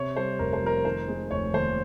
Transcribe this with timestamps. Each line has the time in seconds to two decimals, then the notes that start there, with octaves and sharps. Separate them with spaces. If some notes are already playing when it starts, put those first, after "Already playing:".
Already playing: C3 C#5
0.16 G3 C5
0.39 F1 A#4
0.53 C5
0.62 F2 A#4
0.85 D#3 C5
1.08 G#3
1.31 F1 C#5
1.53 D#2 C5